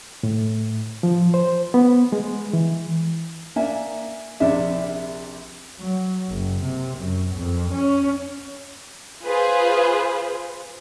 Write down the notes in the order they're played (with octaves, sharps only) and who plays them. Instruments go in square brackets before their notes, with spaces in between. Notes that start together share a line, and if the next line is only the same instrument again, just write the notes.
[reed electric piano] A2
F3
C5
B3
G#3
E3
[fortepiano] A#3 D4 E5 G#5
A#1 C3 D4 E5
[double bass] F#3
F#1
C3
F#2
F2
C#4
[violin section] F4 G#4 B4 C5